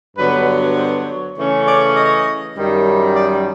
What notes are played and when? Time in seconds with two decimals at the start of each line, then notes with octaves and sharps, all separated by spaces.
0.17 G2 D3 F#3 B3 B4
0.77 C5
1.07 C#5
1.37 C#3 E3 A3 C#4
1.66 D5
1.96 D#5
2.56 F#2 D#3 G3
3.15 D5